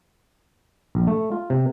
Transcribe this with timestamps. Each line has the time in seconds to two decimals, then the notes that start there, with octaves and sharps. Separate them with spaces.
0.95 A#1
1.07 A3
1.32 F4
1.50 C3